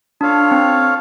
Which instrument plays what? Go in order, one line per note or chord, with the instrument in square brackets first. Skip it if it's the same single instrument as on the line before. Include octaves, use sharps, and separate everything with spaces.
[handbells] D4 [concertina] F4 A4 C#5 F5
[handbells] C4